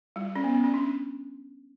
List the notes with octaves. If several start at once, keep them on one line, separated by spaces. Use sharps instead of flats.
G3
C#4
B3
B3
C#4
D4